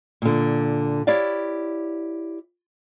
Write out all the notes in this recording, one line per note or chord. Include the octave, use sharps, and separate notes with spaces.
A#2 D3
E4 G4 C#5 D5 F5